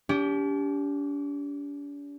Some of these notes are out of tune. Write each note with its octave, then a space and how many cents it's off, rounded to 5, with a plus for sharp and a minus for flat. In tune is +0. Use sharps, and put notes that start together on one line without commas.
D4 -45 G4 +5